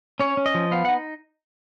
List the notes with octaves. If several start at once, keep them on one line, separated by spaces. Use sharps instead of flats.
C#4 C#5
C#4
D#5
F3
B3 F5
F#5
D#4